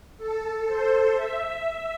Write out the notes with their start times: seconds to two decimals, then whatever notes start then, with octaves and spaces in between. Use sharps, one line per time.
0.18 A4
0.66 C5
1.15 E5
1.64 E5